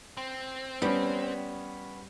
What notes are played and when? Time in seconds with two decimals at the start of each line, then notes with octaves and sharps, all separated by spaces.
0.17 C4
0.82 G3 B3 C#4